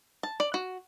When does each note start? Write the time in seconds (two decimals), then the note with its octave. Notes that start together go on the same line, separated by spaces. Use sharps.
0.23 A5
0.40 D5
0.54 F#4